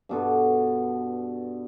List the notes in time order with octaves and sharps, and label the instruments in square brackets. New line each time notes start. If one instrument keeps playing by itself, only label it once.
[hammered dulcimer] G2 B2 A4